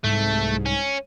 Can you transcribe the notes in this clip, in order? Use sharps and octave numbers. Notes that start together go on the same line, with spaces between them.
C2 G#2 A3
C#4